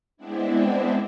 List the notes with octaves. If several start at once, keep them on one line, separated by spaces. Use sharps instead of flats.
G#3 B3 C4 D4 E4